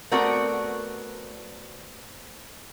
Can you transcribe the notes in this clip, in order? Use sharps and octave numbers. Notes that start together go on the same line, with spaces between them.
A3 B3 C4 F#4 A#4 D5